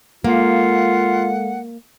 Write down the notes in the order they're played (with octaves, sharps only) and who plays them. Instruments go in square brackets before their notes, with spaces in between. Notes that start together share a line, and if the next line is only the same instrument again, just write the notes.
[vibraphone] G#3 A4 F5 [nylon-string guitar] A#3 [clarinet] F4 [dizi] F#5